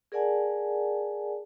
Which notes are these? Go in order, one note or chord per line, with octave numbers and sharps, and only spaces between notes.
G#4 A#4 D5 F#5 G#5 A5